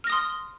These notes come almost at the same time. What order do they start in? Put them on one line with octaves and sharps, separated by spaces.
F6 A#6 D#6 C6